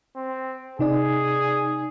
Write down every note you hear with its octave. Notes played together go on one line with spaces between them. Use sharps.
C4
C3 D#4 G#4 D5